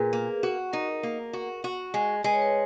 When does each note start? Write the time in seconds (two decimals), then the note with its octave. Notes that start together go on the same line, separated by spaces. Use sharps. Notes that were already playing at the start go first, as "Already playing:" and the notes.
Already playing: A#2 G#4 A#4 B4
0.13 A#3
0.43 F#4
0.73 D#4 A#4
1.03 A#3
1.33 F#4
1.64 F#4
1.94 G#3
2.24 G#3 B4
2.33 C#5
2.42 B4